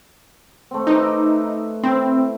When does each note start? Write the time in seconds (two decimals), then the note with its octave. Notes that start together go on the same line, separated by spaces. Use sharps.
0.71 A3 C4
0.87 D#4 B4 E5 D6
1.83 C4 E4